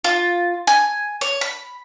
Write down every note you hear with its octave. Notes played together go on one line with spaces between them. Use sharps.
F4
G#5
C#5
B5